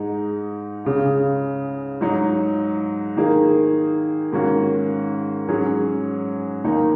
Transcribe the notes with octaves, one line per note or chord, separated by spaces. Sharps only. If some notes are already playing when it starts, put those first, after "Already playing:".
Already playing: G#2 G#3 D#4
C#2 C#3 G#3
G#2 F#3 D#4
D#3 A#3 D#4 G#4
G#2 D#3 A#3 C#4 F#4
G#2 F#3 C#4 G#4
D#2 D#3 A#3 D#4